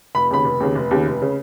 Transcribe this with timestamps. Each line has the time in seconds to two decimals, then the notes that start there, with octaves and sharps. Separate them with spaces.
0.15 F1 B5
0.31 D#2 C#3 B5
0.45 F1
0.60 D#2 C#3
0.75 F1
0.91 D#2 C#3
1.06 F1
1.22 C#3